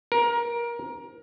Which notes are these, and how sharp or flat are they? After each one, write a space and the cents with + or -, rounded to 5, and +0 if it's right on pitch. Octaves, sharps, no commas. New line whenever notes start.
A#4 +20